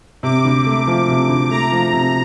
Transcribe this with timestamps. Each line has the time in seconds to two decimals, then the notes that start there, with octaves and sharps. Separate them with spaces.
0.23 C3 D6
0.45 D2
0.66 A3
0.87 F3
1.08 C3
1.29 D2
1.50 A3 A#5
1.72 F3
1.93 C3